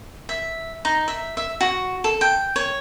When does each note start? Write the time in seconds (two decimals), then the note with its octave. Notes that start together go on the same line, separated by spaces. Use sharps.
0.29 E5
0.85 D#4
1.08 E5
1.37 E5
1.61 F#4
2.04 A4
2.21 G5
2.56 C#5